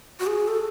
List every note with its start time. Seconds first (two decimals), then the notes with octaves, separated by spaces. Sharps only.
0.20 F#4
0.27 G#4
0.48 A4